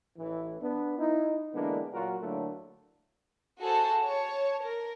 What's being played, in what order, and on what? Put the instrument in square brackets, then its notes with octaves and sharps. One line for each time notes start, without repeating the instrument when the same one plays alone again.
[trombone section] A1 E3
B3 D4
D#4 E4
D3 E3 G#3 A#3 B3 D4
A#2 F#3 F4 F#4 A#4
A2 D3 F#3 A3 A#3
[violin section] F#4 G#4 A4 C5 A5
C#5 A5
A#4